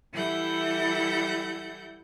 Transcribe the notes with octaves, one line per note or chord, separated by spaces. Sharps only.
E3 G3 E4 A4 F#5 G6